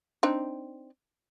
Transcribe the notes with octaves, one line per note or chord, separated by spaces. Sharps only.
C4 D4 D#4